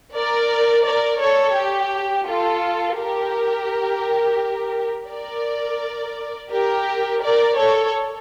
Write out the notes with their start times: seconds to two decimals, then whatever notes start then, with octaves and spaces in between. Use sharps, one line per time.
0.14 A#4 D5
0.85 A#4 D5
1.20 A4 C#5
1.55 G4
2.26 F4 A4
2.97 G4 A#4
5.09 A#4 D5
6.50 G4 A#4
7.21 A#4 D5
7.56 A4 C#5